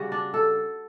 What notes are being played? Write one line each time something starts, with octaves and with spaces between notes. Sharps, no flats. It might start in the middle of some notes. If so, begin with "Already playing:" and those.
Already playing: C#3 G3 F#4
D4
A4